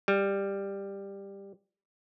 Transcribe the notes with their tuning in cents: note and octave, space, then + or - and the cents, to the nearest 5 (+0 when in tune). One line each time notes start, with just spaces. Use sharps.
G3 +10